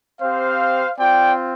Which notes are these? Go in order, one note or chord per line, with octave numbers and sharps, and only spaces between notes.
C4 G4 C5 F5
C4 F4 D5 G5